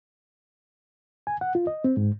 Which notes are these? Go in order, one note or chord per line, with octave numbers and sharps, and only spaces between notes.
G#5
F#5
F4
D#5
C4
G#2